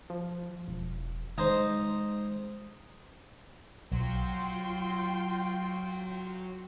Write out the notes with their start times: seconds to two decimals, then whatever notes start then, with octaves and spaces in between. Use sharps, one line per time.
0.10 F3
0.68 E1
1.38 G#3 D#4 C5
3.92 B1 F#3 F4 G5 C6